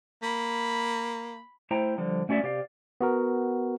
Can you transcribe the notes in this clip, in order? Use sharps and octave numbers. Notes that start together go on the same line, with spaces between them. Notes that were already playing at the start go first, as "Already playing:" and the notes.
A#3 B5
A3 E4 C5 G5 A#5
D3 F3 G3
A3 C#4 F#4 D5 E5
C3 G4 D5 F5
B3 F#4 A#4